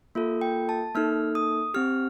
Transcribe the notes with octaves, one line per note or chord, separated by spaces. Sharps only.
A#3 F4 A4
G5
A5
A#3 D#4 A4 F6
D#6
C4 G4 F6